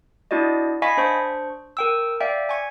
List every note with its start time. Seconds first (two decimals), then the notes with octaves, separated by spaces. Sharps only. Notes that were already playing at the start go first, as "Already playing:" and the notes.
0.31 D4 E4 F#4 D5 D#5
0.82 D#5 F5 G#5 B5 C#6 B6
0.97 D4 C5 C#6
1.77 A#4 G5 E6
2.21 D5 E5 F5 G5
2.49 G#5 C#6